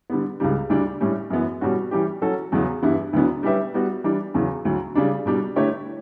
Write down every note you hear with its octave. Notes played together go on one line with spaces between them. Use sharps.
D3 G3 B3
C#2 C#3 G3
D2 D3 G3 D4
A2 G3 C#4
F#2 E3 B3
B2 G3 C#4 F#4
E3 G3 C#4 G4
F#3 C#4 F#4 A4
E2 C#3 F#3 B3
G2 E3 G3 B3 E4
D2 D3 F#3 B3 D4
G3 C#4 G4 B4 E5
G3 B3 F#4
E3 G3 D4
E2 C#3 F#3
D2 D3 F#3
C#3 G3 D4
B2 G3 D4
D3 A3 E4 G4 C#5